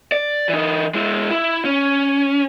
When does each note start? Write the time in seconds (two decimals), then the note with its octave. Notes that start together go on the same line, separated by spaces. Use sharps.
0.12 D5
0.49 E3 D#4
0.94 G#3 E4
1.31 E4
1.65 C#4